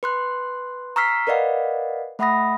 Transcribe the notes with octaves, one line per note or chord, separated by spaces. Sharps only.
B4 C6 F#6
A#5 C#6 E6 F6 B6 C7
A#4 B4 D5 D#5 F5 F#5
A3 E5 F#5 B5 D#6 A#6